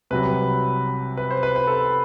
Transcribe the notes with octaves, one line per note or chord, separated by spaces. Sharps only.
C2 C3 F#3 B4
B4
C5
B4
B4
A4